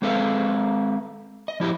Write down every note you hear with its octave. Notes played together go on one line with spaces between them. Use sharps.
G#3 C4 A4 B4 D#5 F5
D#5
F3 E4 G4 D#5